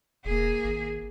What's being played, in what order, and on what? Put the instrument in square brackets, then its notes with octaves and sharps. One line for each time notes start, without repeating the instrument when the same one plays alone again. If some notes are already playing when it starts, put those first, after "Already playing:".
[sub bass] E1 [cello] A#3 G#4
[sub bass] G#1